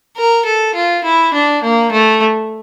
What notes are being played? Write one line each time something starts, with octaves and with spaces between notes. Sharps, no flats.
A#4
A4
F4
E4
D4
A#3
A3